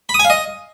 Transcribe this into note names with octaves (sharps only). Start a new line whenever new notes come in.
B5
D#6
G#5
F5
D#5